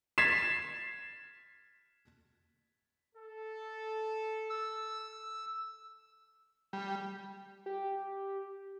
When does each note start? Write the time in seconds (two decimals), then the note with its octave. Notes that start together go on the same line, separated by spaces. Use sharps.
0.18 G#6 A6 B6 C7 E7
3.16 A4
4.50 E6
6.73 G3
7.66 G4